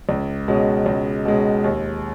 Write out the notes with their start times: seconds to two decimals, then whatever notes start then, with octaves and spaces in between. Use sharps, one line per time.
0.09 C#2
0.48 B2 G#3 C#4
0.86 C#2
1.25 B2 G#3 C#4
1.64 D#2